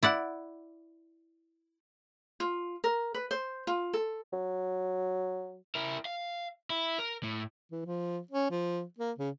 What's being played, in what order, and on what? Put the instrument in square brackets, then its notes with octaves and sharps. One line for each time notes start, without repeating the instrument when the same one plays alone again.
[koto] E4 D5 F#5
[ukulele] F4
A#4
B4
C5
F4
A4
[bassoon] F#3
[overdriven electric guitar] E4 A#4
F5
E4
A#4
A2
[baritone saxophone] E3
F3
C#4
F3
A#3
C#3